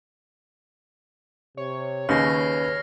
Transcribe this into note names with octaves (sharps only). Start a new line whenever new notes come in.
C3 C#5
D#2 C#3 B4 F6 A#6 C7